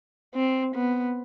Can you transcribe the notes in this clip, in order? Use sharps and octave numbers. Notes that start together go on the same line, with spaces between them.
C4
B3